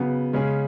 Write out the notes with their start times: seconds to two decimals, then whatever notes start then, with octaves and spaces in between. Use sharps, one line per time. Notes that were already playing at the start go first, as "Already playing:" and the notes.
Already playing: C#3 F#3 B3
0.33 C#3 G#3 C#4 G#4